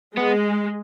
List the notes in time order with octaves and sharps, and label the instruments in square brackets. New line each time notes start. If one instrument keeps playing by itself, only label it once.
[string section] G#3 [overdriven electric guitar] B3